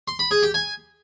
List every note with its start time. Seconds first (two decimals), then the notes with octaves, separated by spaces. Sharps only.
0.08 C6
0.19 B5
0.31 G#4
0.43 G4
0.54 G#5